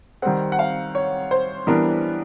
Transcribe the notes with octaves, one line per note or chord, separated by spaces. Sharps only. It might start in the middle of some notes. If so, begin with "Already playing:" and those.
D#3 G3 C4 F#5
F#5
F5
C#5
C5
E3 G3 B3 D4 A#4